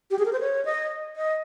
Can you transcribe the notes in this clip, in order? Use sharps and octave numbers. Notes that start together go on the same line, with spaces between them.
G4
G#4
A#4
C5
C#5
D#5
D#5